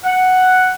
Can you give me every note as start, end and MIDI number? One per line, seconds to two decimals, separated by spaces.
0.04 0.72 78